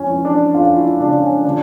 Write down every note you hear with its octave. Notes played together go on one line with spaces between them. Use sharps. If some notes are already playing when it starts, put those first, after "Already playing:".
Already playing: F2 C#4
E3
D4
F2 F4
E4
C#3 D4
C#4
D3 D4